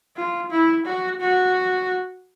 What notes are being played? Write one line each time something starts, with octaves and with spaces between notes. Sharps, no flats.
F4
E4
F#4
F#4